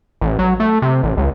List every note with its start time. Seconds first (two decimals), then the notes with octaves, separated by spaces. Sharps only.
0.21 A1
0.39 F#3
0.60 A3
0.82 C3
1.03 A1
1.17 C#2